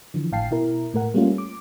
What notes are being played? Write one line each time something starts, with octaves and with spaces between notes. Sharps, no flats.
D3 E3 F3
G#1 A2 F5 G5 A5 C7
B2 E4 A#4
A2 A3 A#4 F#5
G3 A3 A#3 C#4 F4
D6